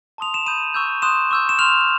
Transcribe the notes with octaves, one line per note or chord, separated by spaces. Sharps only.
A5 C6 D#6 F7
E7
B5 D#6 G6 D#7
C#6 E6 G6
C6 D#6 F#6 E7
C#6 E6 G6
E7
C6 F6 F7